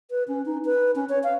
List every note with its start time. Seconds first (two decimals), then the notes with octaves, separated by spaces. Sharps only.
0.11 B4
0.28 C#4
0.46 D#4
0.65 B4
0.95 C#4
1.09 C#5
1.24 F5